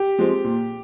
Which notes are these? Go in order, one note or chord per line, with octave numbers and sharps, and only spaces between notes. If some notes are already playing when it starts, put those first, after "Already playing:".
Already playing: G4
F3 G#3 C4
A#2